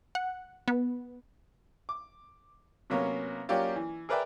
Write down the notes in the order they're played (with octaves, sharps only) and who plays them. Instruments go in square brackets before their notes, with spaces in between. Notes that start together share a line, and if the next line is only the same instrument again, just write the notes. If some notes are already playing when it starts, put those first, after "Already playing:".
[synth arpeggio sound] F#5
B3
[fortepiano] D6
C3 F#3 A#3 B3 C#4
F#3 A#3 C#4 F4 G4 D5
E3
G#4 A#4 B4 D5 E5 G5